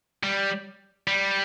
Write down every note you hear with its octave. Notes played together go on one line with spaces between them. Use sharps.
G3
G3